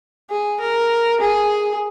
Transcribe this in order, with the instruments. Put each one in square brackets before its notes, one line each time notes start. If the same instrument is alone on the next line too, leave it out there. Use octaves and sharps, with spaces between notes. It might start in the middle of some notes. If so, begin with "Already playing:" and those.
[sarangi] G#4
A#4
G#4